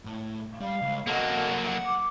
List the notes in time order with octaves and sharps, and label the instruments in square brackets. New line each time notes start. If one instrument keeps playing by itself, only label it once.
[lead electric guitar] A2
[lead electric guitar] G3 [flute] F5
[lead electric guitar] C#2
[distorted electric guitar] F#3 A#3 [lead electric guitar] A4 D#5 [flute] F#5
[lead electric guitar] F#5
[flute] D6